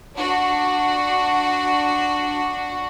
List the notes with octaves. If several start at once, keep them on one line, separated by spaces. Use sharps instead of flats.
D4 F#4